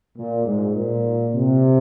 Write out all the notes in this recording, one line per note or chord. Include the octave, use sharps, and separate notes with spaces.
A#2
G#2
A#2
C3